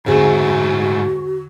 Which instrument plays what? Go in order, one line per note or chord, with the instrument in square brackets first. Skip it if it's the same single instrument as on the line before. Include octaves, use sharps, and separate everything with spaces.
[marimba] E2 D3 [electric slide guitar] G#2 A3 [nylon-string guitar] C4 G#4 [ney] F#4